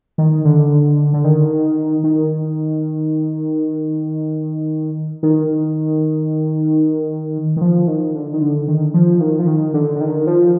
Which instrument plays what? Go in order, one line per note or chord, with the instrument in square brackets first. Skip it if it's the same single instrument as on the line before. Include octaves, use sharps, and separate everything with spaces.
[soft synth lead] D#3
D3
D3
D#3
D#3
D#3
D#3
F3
D#3
D3
D#3
D3
D#3
F3
D#3
F3
D#3
D3
D3
D#3
F3